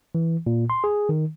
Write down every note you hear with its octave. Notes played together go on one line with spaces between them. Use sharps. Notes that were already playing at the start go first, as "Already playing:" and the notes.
E3
A#2
C6
G#4
D#3